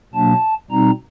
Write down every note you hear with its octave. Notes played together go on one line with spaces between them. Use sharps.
B2 F#3 A#3 D4 A5
B2 G3 C4 D#4 A#5